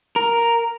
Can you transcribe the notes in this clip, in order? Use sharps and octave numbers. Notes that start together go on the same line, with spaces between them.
A#4